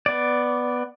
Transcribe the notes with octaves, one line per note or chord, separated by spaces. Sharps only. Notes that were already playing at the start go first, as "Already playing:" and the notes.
B3 D5